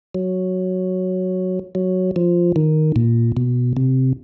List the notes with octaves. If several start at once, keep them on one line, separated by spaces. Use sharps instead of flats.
F#3
F#3
F3
D#3
A#2
B2
C3